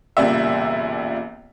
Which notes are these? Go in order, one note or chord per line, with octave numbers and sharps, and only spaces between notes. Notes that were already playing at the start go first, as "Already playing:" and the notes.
E1 C#2 A#2 G3 D5 E5